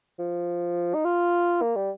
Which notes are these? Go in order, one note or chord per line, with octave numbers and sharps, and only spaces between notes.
F3
D#4
F4
A#3
G3